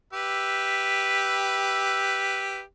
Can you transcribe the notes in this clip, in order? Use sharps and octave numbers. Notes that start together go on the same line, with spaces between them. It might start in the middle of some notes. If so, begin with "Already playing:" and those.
G4 B4 E5